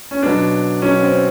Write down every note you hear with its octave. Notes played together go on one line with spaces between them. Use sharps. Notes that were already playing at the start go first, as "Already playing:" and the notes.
C#4
B2 F#3 D4
B2 F#3 C#4
C4